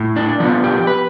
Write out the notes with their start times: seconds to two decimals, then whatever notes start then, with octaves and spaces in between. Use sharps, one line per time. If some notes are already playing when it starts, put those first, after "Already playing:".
Already playing: A2
0.16 D4
0.40 F3 B3 D4
0.64 G4
0.87 B4